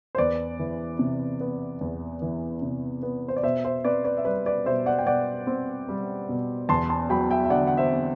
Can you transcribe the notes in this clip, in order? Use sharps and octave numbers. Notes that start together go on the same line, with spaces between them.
C5
E2 B4 D5
E3
C3
B3
E2
E3
C3
B3
C5
D5
B2 C5 E5
C5 E5
C4 B4 D5
B4 D5
E5
G3 B4 D5
B4 D5
B2 C5 E5
D5 F#5
G5
B2 D5 F#5
C4
G3
B2
E2 A5 C6
A5 C6
F#3 G5 B5
E5 G5
E5
D3 D5 F#5
F#5
C5 E5
C4